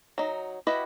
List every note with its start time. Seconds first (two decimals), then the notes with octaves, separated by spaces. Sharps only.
0.18 F#3 D#4
0.67 E4 F#4 G4 B4 D#5